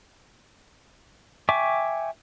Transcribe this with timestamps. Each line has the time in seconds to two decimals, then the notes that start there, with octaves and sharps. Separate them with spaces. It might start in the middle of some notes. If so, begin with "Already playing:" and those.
1.49 E5 G5 G#5 C#6 D6